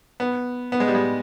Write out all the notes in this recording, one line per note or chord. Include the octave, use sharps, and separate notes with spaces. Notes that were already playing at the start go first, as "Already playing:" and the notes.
B3
B3
G#3
G3
G#3